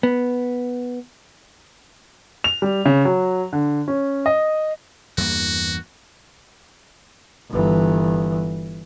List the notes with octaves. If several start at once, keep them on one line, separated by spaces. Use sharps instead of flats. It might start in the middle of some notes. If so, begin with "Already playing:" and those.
B3
F7
G3
C#3
F#3
D3
C#4
D#5
E2 G2 A#3 F#4
G1 E3